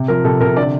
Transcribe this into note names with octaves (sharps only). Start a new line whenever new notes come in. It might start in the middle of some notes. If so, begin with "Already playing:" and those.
Already playing: C3
F3 A#4
C3 A4
C3 A#4
D3 D5